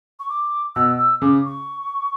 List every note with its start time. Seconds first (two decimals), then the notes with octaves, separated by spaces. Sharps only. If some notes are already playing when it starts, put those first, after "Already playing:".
0.20 C#6
0.29 D6
0.76 B2 E6
0.98 E6
1.22 C#3 D6
1.45 C#6